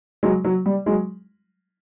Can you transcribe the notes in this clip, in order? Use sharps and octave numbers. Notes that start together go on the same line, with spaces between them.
F#3 G#3
F#3
G3
F#3 G#3